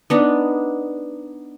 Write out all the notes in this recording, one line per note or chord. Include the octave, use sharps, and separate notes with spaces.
B3 D4 D#4